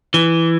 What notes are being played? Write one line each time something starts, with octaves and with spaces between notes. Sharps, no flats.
E3